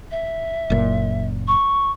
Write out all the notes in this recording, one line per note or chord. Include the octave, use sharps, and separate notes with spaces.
E5
F#1 A#2
C#6